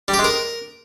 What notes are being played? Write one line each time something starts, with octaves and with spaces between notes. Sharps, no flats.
G3
G4
G#3
A#4